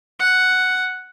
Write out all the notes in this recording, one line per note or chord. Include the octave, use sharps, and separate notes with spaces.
F#5